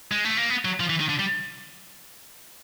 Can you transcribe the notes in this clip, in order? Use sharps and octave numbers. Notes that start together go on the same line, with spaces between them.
G#3
A3
A#3
B3
F#3
F3
E3
D#3
D3
G3